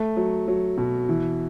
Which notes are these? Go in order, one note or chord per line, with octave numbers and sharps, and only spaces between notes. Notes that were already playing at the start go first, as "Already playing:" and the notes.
Already playing: A3
F#3
F#3
B2
E3